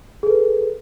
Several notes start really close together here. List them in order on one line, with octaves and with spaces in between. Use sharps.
G#4 A4 B4